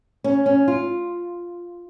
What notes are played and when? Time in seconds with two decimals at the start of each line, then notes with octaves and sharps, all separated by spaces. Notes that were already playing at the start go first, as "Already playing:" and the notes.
0.24 C#4
0.46 C#4
0.68 F4